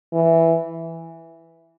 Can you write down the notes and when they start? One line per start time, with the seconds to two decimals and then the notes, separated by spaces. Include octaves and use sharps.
0.13 E3